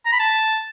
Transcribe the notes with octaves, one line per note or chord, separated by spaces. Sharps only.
A#5
B5
A5